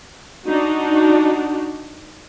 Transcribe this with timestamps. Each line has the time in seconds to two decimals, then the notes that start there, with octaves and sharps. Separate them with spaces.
0.47 D4 D#4 F#4